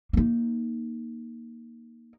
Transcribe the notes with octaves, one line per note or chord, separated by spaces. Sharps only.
A#3 D#4